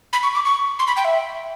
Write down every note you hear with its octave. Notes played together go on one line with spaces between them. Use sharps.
B5
C#6
D6
C#6
C6
B5
G5
E5